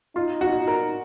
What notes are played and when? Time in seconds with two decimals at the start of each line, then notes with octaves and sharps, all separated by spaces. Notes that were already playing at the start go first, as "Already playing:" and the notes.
0.15 D#4 F4
0.41 F#4
0.68 A#4